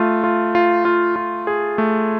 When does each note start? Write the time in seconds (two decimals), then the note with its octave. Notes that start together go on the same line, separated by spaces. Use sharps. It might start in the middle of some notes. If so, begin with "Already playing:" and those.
Already playing: A3 F4
0.24 F4
0.55 F4
0.85 F4
1.16 F4
1.47 G#4
1.78 A3